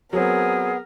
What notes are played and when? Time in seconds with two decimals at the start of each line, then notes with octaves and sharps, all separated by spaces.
0.13 F#3 B3 C4 G#4 A#4